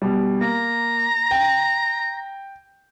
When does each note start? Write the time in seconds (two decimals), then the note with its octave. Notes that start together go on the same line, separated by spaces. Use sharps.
0.02 B2 G3
0.41 A#3 A#5
1.31 G5